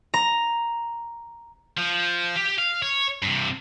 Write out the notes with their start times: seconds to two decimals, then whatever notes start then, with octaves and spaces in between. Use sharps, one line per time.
0.14 A#5
1.78 F3
2.36 G4
2.59 F5
2.83 C#5
3.22 G2 C3